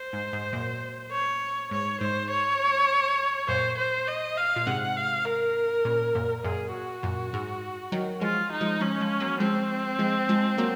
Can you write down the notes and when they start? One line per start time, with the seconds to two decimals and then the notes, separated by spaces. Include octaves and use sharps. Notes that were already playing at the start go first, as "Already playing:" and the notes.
Already playing: C5
0.13 G#2
0.33 G#2
0.53 F#2 A#2
1.11 C#5
1.71 G#2 C#5
2.01 G#2 C5
2.30 C#5
3.48 F#2 A#2 C5
3.78 C5
4.08 D#5
4.38 F5
4.56 A#2
4.67 G#2 C3 F#5
4.96 F5
5.26 A#4
5.85 A#2 C#3
6.15 F#2 A#2
6.44 F#2 A#2 G#4
6.73 F#4
7.03 F#2 A#2
7.33 G#2
7.92 D#3 F#3
8.21 F3 G#3 F4
8.52 D#4
8.61 F3 G#3
8.81 F3 G#3 C#4
9.00 F3 G#3
9.20 F#3 A#3
9.40 F3 G#3 C4
9.99 F3 G#3
10.29 F3 G#3
10.58 F#3 A#3